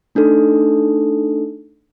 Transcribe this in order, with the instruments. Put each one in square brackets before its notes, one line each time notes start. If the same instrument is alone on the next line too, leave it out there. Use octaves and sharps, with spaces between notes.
[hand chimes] A3 D4 D#4 A4